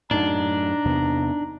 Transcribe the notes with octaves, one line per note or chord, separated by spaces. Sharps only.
F#2 A2 D4 D#4 A#5
E2 C3 B3